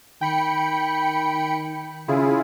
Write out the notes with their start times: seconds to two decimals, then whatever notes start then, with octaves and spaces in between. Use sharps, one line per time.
0.21 D#3 G5 B5 C#7
2.08 C#3 E4 F4 G#4